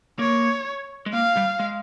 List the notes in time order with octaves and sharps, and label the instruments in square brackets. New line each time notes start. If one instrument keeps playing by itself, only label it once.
[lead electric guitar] A#3 [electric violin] C#5
[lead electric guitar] G#3
[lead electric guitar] A#3 [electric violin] F5
[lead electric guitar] G3
G#3